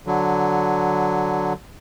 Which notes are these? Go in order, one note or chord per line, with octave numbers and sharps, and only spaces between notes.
D3 F#3